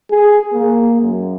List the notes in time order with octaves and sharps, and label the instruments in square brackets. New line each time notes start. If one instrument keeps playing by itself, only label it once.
[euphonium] G#4
A#3
F#2